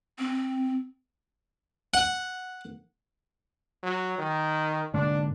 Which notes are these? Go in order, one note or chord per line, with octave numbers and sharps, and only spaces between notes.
C4
F#5
F#3
D#3
G#2 D3 A#3 D4